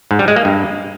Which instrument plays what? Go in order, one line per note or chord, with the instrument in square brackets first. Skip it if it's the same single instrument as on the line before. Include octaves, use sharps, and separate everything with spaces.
[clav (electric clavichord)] G#2
G3
G#3
A#3
G2